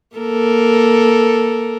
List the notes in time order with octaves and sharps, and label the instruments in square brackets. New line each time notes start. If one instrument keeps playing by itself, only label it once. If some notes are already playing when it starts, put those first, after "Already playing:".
[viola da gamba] A#3 A4 A#4